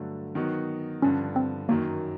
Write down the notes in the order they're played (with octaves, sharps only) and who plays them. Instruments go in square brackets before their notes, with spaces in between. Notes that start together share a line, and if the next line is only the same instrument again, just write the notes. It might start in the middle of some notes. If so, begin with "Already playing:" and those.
Already playing: [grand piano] G2 D3 F#3 A3
D#3 F#3 B3 D#4 F#4
[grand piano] G2 D3 F3 [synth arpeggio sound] C#4
[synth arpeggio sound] C4
[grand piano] F#2 D#3 F#3 [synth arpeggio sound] A#3